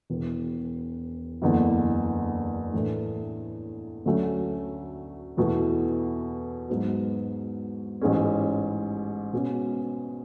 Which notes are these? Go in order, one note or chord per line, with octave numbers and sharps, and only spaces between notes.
E1 E2 B2
F#1 E2 D3
A2 E3 A3 D4
D2 D3 F#3 A3 C#4
E2 B2 A3 E4 A4
G#2 F#3 B3 F#4
A1 G#2 G#3 C#4
B2 G#3 C#4